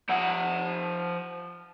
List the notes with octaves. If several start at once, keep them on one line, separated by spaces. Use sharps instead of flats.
F3 F#5